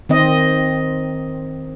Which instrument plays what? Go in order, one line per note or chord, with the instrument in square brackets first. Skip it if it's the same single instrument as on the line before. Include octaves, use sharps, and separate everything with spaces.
[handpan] D#3 C4 D#5